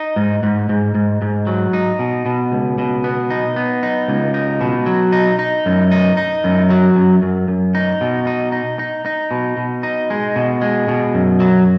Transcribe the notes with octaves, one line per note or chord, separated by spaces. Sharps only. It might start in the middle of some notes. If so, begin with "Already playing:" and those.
Already playing: D#4
G#2
G#2
G#2
G#2
G#2
F#3
D#4
B2
B2
C#2
B2
B3
D#4
B3
D#4
C#2
D#4
B2
F#3
D#4
D#4
F#2
D#4
D#4
F#2
F#3
F#2
F#2
F#2
D#4
B2
D#4
D#4
D#4
D#4
B2
B2
D#4
G#3
B2
G#3
B2
F#2
F#3